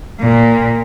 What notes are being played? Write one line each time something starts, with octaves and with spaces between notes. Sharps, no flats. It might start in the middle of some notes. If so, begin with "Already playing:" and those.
A#2